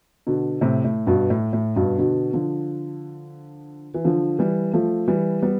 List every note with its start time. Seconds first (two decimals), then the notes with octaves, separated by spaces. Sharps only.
0.27 B2 D3
0.61 A2 C3
0.84 A2
1.07 G2 B2
1.30 A2
1.53 A2
1.76 G2 B2
1.98 B2 D3
2.33 D3 F3
3.94 E3
4.05 D3 F3
4.39 E3 G3
4.73 F3 A3
5.08 E3 G3
5.43 G3 B3